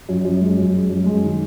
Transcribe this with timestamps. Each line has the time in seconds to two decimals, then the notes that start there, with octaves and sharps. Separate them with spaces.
0.09 F#2
0.25 F#2
0.41 G#3
0.58 F#2
0.74 G#3
0.90 F#2
1.06 G#3
1.23 D#3